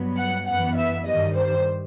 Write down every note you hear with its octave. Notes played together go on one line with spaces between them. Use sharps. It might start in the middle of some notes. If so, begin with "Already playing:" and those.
Already playing: G2 F#3 B3
F#5
F#2 E3 B3 F#5
E5
G2 D#3 G3 D#5
C5